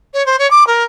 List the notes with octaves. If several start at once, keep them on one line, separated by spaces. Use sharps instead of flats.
C#5
C5
C#5
D6
A#4